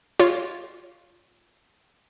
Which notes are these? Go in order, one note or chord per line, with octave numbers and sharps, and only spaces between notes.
F4 C#5